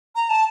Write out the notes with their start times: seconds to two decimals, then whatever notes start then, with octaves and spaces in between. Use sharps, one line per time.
0.15 A#5
0.29 A5